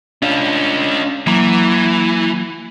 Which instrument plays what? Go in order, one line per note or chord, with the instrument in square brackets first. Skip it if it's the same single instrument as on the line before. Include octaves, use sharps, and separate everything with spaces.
[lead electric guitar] C#4 F4 [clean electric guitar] D4
[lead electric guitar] E3 [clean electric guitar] F#3 A#3 A#5